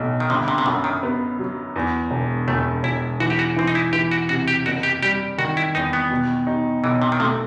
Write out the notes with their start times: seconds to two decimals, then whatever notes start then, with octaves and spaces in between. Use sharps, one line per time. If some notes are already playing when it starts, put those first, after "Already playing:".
Already playing: B1 A2 F#3
0.20 D#3
0.30 G1 C3
0.48 C3
0.58 C3
0.66 F#2 B2
0.84 D#3
1.03 B3
1.39 F#3
1.76 E2
2.11 E1
2.48 E1 A3
2.83 E1 E4
3.20 E3 F#4
3.30 G4
3.39 F#4
3.56 E3 C4
3.67 D#4
3.75 E4
3.93 E3 G4
4.11 F#4
4.29 C3 F#4
4.48 G4
4.66 F#1 F#4
4.83 G4
5.03 G3 G4
5.38 D#3 F#4
5.57 E4
5.75 E2 D#4
5.93 B3
6.10 B2
6.47 D#4
6.84 B1 E3
7.02 C3
7.12 D#3
7.20 C3 A3